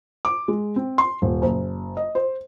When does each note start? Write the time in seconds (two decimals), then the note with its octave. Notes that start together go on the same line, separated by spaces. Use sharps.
0.25 D6
0.48 G#3
0.76 C4
0.98 C6
1.22 D#1
1.42 F#1
1.97 D#5
2.15 C5